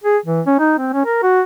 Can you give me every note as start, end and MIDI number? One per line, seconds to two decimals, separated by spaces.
0.04 0.18 68
0.26 0.41 52
0.46 0.55 61
0.59 0.77 63
0.78 0.91 60
0.93 1.04 61
1.06 1.20 70
1.23 1.42 66